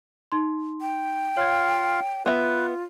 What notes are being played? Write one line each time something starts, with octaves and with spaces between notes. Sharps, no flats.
D#4 C6
G5
F4 C#5 F5 G#6
B3 F4 B4 E5